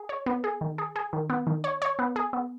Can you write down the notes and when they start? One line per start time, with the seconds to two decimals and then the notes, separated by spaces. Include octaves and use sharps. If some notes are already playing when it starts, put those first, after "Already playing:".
Already playing: G#4
0.09 C#5
0.26 B3
0.44 G#4
0.61 D#3
0.78 G#4
0.96 G#4
1.13 D#3
1.30 B3
1.47 D#3
1.64 C#5
1.82 C#5
1.99 B3
2.16 G#4
2.33 B3